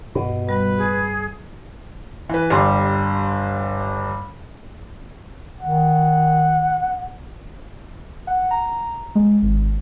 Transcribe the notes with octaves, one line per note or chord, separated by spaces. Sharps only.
G2 B2
G3 B4
G#4
E3 B4
G1 G3 C6
D#3 F#5
F#5
A#5
G#3
G#1